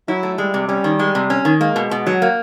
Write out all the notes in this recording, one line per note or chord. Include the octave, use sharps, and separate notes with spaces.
F#3 E4
A3
G3 G#3
C3
G3 C#4
D#3
G#3
C3
C#4
D#3
G#3 A#3
B2
B2
F#3
A#3